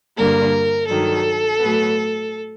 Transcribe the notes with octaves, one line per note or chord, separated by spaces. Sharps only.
G2 D3 G3 A#3 A#4
G2 D#3 F#3 A4
A2 F#3 B3